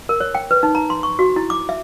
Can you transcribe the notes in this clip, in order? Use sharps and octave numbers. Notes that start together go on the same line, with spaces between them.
A#4
C#5
G5
B4
D#4
A#5
C6
C#6
F#4
E4
D6
E5